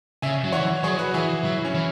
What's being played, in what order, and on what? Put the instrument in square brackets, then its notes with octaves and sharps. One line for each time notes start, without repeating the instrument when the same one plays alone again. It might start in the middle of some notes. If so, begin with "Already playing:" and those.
[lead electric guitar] C#3 [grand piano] E5 G#5
[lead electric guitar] F#3
[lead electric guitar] E3 [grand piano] C#5 F#5
[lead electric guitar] F#3 [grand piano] G#4 C#5
[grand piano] F#4 B4
[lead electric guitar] E3 [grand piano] E4 G#4
[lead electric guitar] F#3 [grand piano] E4
[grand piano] C#4
[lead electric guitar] E3